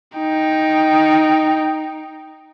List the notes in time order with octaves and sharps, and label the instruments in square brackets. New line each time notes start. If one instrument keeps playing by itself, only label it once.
[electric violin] D#4 G5